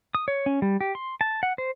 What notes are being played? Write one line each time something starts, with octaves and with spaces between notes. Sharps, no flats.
D#6
C#5
C#4
G3
G4
C6
A5
F#5
C5